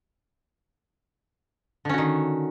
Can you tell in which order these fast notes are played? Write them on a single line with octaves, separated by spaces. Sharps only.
D3 C#4 F#4 D#3